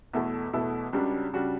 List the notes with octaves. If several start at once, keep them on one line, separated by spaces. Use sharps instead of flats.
E2 B2 A3 E4 A4
E2 B2 A3 E4 A4
C#2 C#3 G3 D4 F#4
C#3 G3 D4 F#4